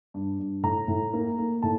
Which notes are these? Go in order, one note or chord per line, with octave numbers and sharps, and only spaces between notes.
G2
G2
A2 A#5
A2
A#3
A#3
A2 A5